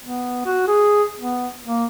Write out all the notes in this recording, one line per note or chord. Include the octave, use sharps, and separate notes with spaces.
B3
F#4
G#4
B3
A#3